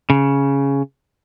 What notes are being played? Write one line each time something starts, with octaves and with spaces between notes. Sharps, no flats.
C#3